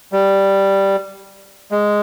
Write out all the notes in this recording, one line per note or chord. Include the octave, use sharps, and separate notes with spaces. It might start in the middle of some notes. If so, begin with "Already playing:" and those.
G3
G#3